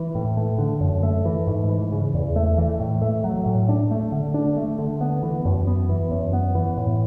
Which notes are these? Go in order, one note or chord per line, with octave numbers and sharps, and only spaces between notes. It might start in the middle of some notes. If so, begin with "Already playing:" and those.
Already playing: E3
A2
A3
D3
F#2
A3
E3
G#2
E3
C#3
E2
A3
E3
A2
A3
F#3
A2
D4
A3
D3
D4
A3
D3
B3
E3
F#2
B3
E3
F#2
B3
E3
A2